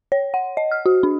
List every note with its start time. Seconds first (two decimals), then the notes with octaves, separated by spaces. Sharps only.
0.12 C#5
0.34 F#5
0.57 D#5
0.71 F6
0.86 F#4
1.03 D4